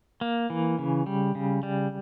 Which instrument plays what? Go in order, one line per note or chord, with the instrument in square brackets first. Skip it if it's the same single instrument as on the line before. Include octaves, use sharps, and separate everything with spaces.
[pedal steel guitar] A#3
E3
C#3
G3
C#3
G3